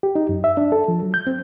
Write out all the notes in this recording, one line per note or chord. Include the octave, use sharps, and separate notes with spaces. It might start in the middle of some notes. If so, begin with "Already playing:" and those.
G4
D#4
F#2
E5
D4
A4
F3
F#3
G6
C4